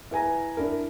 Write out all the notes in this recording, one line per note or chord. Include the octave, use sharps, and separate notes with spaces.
E4 B4 G#5 A#5
D4 E4 A#4